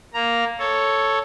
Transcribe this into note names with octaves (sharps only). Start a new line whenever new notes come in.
A#3 A#5
A4 C#5